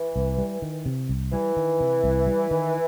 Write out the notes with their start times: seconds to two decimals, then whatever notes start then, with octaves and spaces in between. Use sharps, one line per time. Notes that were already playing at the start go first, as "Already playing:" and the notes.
Already playing: E3
0.16 C2
0.38 G3
0.62 D#3
0.86 C3
1.09 C2
1.32 E3 G3
1.57 D#3
1.80 C3
2.04 C2
2.27 G3
2.51 D#3